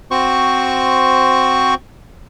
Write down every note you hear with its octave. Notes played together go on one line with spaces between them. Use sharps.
C4 F#4 C5 C#6